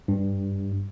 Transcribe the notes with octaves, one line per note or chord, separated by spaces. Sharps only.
G2